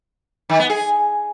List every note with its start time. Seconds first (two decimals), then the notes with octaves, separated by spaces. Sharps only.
0.49 D#3
0.60 B3
0.70 G#4